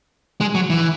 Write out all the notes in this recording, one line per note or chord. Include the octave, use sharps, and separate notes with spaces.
G#3
F#3
E3